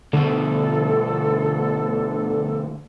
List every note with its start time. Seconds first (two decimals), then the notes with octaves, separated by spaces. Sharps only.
0.13 D2 B2 D3 A4